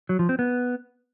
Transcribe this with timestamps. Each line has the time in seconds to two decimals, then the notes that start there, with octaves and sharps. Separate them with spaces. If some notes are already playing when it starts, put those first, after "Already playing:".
0.09 F#3
0.19 F3
0.29 C4
0.39 B3